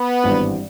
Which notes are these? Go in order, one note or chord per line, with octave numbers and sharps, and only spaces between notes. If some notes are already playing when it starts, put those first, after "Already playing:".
Already playing: B3
G#1 G2 E3 G3 C4